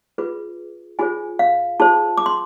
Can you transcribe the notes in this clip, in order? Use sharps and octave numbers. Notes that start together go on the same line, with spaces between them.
F4 G#4 B4
F4 G#4 C5 G#5
F5
F4 G#4 C5 A5
D6
C6